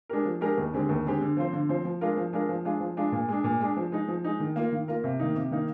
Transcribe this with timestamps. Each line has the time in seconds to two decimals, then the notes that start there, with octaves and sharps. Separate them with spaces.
0.09 G#3 D4 G4 A#4
0.25 F3
0.41 G#3 D4 G4 A#4
0.58 D#2
0.74 D3 G#3 C4 G4
0.89 D#2
1.05 D3 G#3 C4 G4
1.21 D3
1.37 F3 C4 F4 C5
1.53 D3
1.69 F3 C4 F4 C5
1.85 F3
2.01 G#3 D4 F4 A#4
2.17 F3
2.33 G#3 D4 F4 A#4
2.49 F3
2.65 G#3 D4 F4
2.80 F3
2.97 G#3 D4 F4
3.12 A#2
3.29 G#3 D4
3.44 A#2
3.60 G#3 D4
3.77 F3
3.92 G#3 D#4
4.08 F3
4.24 G#3 D#4
4.40 D#3
4.56 A#3 F4 A#4
4.72 D#3
4.88 A#3 F4 A#4
5.04 C3
5.19 D#3 A#3 D#4
5.35 C3
5.51 D#3 A#3 D#4